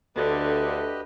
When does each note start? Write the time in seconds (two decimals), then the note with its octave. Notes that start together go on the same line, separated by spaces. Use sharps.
0.16 D2 D3 G4 B4 D#5